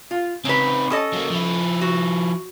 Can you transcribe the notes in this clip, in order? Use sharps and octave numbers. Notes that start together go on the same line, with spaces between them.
F4
C#3 C4 D#4 B4
C#4 A4 D#5
F#3 A#3
F3 E4
F#4